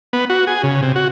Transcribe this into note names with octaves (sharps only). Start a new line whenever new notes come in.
B3
F#4
G#4
C#3
C3
F#4